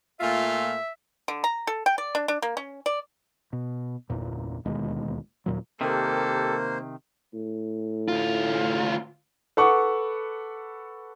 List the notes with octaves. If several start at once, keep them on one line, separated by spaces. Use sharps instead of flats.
A#2 A3 F4 E5
D3
A#5
A4
G5
D5
D4
D4
A#3
C#4
D5
B2
G1 E2 A#2
D1 D#2 B2 G#3
D#2 A#2 F#3
C3 D#3 A#3 G4 A4 C5
A2
D2 F4
A4 B4 F#5 C#6 D6